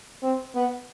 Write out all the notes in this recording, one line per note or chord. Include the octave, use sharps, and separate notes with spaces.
C4
B3